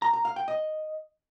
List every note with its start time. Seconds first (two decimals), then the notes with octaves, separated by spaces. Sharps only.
0.02 A#5
0.13 A#5
0.25 F5
0.36 G5
0.48 D#5